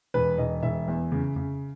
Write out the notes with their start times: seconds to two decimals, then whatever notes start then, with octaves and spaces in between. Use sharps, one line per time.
0.14 E1 B4
0.38 E1 D#5
0.63 E1 E5
0.88 E2
1.12 C#3
1.36 C#3